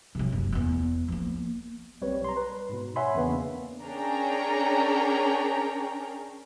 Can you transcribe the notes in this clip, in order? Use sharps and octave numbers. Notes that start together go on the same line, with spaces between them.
C3 F#3
F#1
E2 B3
F3 A#3
B1 G3 C4 B4 C#5
A#5 C6
B4
G#2 B2
C#5 E5 F#5 G#5 B5 C6
E2 C#3 A#3 B3 D4
C#4 D4 G#4 A#4 G5 A#5